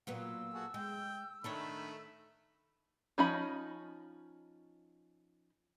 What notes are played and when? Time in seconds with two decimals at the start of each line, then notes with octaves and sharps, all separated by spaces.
0.07 A#2 F#3 B3 F#5
0.20 E6
0.54 F#4 G#4 A4
0.74 G#3 G5
1.44 D#3 A3 D4 A4 C#5 B5
3.18 F3 C#4 D#4 D#5 B5